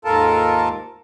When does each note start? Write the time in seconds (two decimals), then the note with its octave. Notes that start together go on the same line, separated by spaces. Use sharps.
0.05 D#2 G#2 F4 A4 A#4 A5